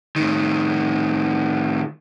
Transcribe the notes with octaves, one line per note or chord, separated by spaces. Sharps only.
A2 D#3